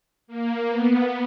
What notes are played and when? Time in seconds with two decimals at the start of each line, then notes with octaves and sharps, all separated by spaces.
0.27 A#3
0.69 B3